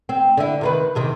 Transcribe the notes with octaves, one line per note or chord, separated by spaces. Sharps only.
C4
D3 E4
C3 D#3 B4
E2 C3 D#3